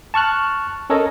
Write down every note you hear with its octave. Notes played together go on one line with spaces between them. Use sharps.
A5 C#6 F6 F#6
C#4 A4 A#4 C#5 D#5